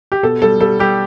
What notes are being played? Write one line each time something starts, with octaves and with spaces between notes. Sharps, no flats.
G4
B2 A4
G3 A4
G3 A4
G3 G4